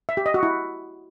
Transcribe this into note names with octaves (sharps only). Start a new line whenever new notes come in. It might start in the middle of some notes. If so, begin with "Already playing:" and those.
E5
G4
D#5
F#4
E4